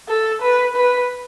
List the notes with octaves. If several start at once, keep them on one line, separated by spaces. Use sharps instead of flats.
A4
B4
B4